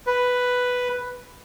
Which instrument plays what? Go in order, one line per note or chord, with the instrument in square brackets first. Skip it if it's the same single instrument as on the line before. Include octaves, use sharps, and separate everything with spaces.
[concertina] B4